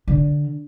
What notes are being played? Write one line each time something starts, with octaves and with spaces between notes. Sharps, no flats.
D3